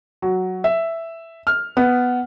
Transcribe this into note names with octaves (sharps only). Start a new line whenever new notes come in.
F#3
E5
F6
B3